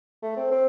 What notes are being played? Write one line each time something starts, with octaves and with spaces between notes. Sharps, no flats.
A3
C4
C4